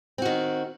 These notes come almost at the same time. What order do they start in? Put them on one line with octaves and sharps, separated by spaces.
C4 F#4 D#3